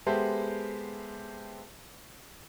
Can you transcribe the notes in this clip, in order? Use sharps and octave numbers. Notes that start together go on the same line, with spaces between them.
G#3 B3 G4 A4 C5 E5